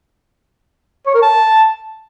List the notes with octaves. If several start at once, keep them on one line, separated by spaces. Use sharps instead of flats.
C#5
A#4
A5